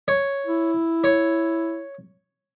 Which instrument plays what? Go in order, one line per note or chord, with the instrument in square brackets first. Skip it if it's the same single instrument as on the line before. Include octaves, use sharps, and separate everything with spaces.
[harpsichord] C#5
[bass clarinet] E4
[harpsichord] C#5